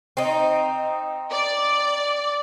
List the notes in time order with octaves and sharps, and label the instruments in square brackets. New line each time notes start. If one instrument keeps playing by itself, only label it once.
[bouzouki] C4 D#4
[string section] D5